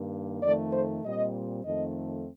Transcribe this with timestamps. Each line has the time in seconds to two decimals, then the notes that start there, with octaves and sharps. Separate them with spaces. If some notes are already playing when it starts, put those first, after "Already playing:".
Already playing: G2 D#3 A#3
0.43 F2 D#3 A3 D5
0.73 C5
1.04 A#2 G3 C4 D#5
1.65 F2 D#3 A3 C4 D#5